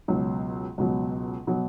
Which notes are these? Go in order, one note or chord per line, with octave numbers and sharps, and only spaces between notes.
C#2 B2 F#3
C#2 B2 F#3
B2 F#3